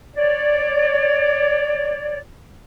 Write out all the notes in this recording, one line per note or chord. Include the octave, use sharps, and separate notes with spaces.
C#5 D5